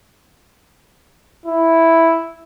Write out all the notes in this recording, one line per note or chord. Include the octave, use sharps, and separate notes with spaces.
E4